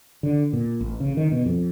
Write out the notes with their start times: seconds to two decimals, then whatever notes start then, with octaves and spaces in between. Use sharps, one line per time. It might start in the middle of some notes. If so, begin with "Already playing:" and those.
0.23 D3
0.53 A#2
0.81 A1
1.00 C#3
1.17 D#3
1.32 B2
1.45 F2